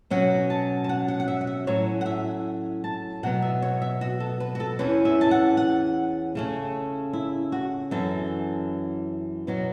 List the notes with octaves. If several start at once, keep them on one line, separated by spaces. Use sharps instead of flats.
B2 F#3 C#4 F#5
A5
A5
F#5
F#5
F#5
E5
F#5
E5
A2 F#3 C#4 C#5
F#5
E5
A5
B2 F#3 B3 F#5
E5
C#5
E5
F#4
A4
B4
F#4
A4
E2 E3 C#4 B4
E5
A5
F#5
F#5
C#3 A3 C#4
E4
F#4
F#2 E3 C#4 A4
B2 F#3 B3